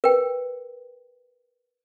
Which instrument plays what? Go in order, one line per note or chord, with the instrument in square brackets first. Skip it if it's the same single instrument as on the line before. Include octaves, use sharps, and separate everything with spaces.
[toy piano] A#4 B4 G5